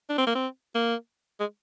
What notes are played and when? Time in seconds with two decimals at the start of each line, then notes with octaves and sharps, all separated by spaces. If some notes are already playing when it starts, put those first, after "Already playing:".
0.09 D4
0.18 C4
0.27 A#3
0.35 C4
0.75 A#3
1.40 G#3